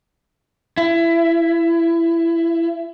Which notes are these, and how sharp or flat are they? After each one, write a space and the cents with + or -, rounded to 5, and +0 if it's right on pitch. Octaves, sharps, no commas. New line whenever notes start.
E4 +20